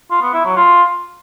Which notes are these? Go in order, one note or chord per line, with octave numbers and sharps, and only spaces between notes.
F4
B3
E4
F#3
F4